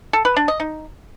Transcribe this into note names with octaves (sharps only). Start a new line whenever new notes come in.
A4
B4
D4
D#5
D#4